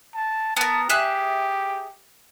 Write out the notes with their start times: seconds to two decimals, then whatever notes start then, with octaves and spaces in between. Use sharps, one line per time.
0.15 A5
0.57 B3 A#4 A5
0.89 G4 G#4 E5 F#6